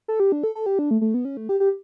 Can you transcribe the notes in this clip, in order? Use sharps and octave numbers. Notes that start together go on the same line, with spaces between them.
A4
G4
D4
A4
A4
G4
D4
A3
A3
B3
C#4
A3
G4
G4